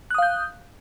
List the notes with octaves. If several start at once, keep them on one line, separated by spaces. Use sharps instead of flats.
F5 D#6 F#6 G6